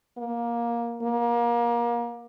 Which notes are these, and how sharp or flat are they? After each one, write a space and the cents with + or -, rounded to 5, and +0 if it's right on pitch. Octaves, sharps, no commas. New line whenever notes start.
A#3 +15
A#3 +30